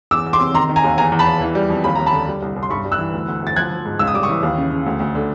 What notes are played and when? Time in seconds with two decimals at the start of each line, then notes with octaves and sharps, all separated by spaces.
0.11 E2 D6 E6
0.26 E2
0.33 C6 D6
0.40 C3
0.54 D#3 A#5 C6
0.69 D#3
0.76 G#5 A#5
0.84 D#2
0.98 E2 G#5 A#5
1.12 E2
1.19 A5 B5
1.27 E2
1.41 E3
1.55 G3
1.70 F2
1.84 D#2 B5
1.95 D#2 A#5
2.06 A5 B5
2.13 D3
2.28 G3
2.42 C2
2.56 C2
2.63 C6
2.70 G2 B5 C#6
2.84 G3
2.92 E6 F#6
2.99 E3
3.13 D2
3.28 D2
3.42 D2 A6
3.56 F3 F#6 G#6
3.71 F3
3.85 G#2
3.99 C#2 E6
4.07 D#6
4.14 G3 D6
4.23 C#6 D#6
4.29 E3
4.43 D#2
4.57 C#3
4.71 C#3
4.86 D2
5.00 D2
5.15 D3